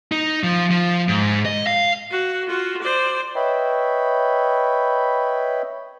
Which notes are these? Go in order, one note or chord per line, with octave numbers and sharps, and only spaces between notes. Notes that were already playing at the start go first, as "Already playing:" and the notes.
D#4
F3
F3
G#2
D#5
F5
F#4
F4 F#4
C5 D5
B4 C#5 D#5 E5 G5 B5